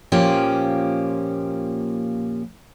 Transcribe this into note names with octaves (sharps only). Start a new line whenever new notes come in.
A#2 F3 A#3 C#4 G4